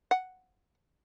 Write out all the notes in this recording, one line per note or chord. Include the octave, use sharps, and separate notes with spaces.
F#5